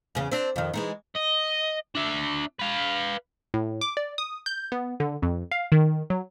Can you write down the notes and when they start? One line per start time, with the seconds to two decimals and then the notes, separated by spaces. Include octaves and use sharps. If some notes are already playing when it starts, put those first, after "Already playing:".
0.15 E2 C#3 C#4
0.32 C4 D4
0.56 F2 D#3
0.74 E3 G#3 D#4
1.16 D#5
1.95 D4 E5
2.59 B4 F5
3.54 A2
3.81 D6
3.97 D5
4.18 D#6
4.46 G6
4.72 B3
5.00 D3
5.22 F2
5.51 F5
5.72 D#3
6.10 F#3